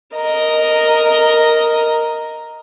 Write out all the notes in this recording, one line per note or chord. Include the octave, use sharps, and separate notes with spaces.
A#4 D#5